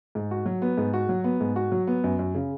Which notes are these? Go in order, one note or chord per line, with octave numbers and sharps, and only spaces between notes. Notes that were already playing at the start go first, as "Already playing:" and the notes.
G#2
F#4
F#3
B3
G#2
F#4
F#3
B3
G#2
F#4
F#3
B3
F#2
F#2
C#3